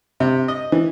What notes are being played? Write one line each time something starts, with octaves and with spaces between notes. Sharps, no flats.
C3
D#5
E3